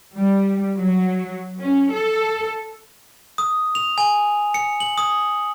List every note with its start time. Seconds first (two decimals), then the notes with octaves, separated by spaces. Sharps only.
0.14 G3
0.76 F#3
1.60 C#4
1.90 A4
3.38 D#6
3.75 F7
3.98 G#5
4.54 C#7
4.80 F#7
4.98 D#6